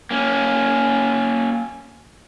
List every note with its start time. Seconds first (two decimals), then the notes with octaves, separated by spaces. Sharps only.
0.11 A#3 C#4